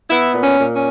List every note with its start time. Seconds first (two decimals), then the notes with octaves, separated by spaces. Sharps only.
0.10 B3 E4
0.34 A#2
0.42 C#4
0.58 A#2
0.74 C#4